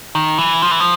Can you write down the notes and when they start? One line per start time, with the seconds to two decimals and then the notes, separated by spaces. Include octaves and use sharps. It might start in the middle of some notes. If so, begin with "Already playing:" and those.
0.15 D#3
0.38 E3
0.62 F3
0.71 E3
0.80 F3